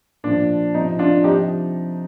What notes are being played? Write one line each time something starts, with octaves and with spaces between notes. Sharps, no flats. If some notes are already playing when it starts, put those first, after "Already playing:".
A#2 F3 D4
C3 F3 D#4
D4 F4
C3 F3 D#4 G4